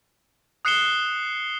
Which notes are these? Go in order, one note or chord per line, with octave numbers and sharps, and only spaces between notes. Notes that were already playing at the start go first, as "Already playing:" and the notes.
D#6 F#6 C7 C#7 E7 G7